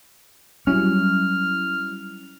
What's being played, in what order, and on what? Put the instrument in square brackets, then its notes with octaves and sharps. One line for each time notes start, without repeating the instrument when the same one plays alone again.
[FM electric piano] F#3 G3 E4 [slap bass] C#4 [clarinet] F6